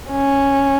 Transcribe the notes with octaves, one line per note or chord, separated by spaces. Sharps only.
C#4